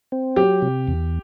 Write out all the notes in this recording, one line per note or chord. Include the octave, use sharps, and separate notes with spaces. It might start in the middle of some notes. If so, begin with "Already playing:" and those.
C4
F#3 G4
C3
E2